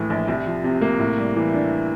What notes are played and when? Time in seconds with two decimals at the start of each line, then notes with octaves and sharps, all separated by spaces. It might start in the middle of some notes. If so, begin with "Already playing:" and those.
Already playing: A#1 A2 E3
0.10 A#1
0.28 C2
0.46 F3
0.64 C3
0.81 A#3
1.00 A2
1.18 G3
1.36 E3
1.54 D4